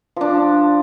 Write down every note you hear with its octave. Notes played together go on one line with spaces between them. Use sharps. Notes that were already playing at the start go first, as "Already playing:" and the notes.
F3 D4